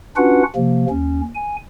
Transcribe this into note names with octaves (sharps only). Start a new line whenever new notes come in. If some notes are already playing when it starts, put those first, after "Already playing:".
C#4 D4 F4 F#4 B4 F#5
C3 F3 A#3
D#2 C#4
G#5